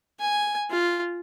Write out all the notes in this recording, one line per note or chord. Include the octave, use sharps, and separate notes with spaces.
G#5
F4